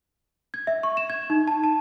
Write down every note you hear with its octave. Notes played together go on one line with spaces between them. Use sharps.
G#6
E5
C#6
E7
G#6
D#4
A5
A5